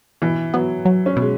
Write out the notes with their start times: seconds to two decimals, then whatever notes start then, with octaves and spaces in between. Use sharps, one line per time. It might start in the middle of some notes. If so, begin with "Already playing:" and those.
0.22 B2 E3
0.54 F#3 B3
0.85 F#3
1.06 C#4
1.16 B2
1.22 G#3